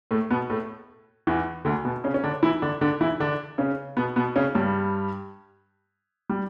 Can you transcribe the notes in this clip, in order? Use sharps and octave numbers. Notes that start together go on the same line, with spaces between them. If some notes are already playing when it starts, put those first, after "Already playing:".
A2 A3
B2 B3
A2 A3
E2 E3
D2 D3
B2 B3
C#3 C#4
C#4
D3 D4
E3 E4
D3 D4
D3 D4
E3 E4
D3 D4
C#3 C#4
B2 B3
B2 B3
C#3 C#4
G2 G3
G3